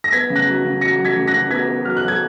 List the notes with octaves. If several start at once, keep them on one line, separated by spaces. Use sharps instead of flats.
A#6
B3 G#6 B6
C#3
F#6 A#6
F#3
C#3
F#3 A#6 C#7
F#3
G#6 B6
C#3
F#6 A#6
C#3
B3 G#6 B6
B3
F#3 F6
F#6
F#3
G#6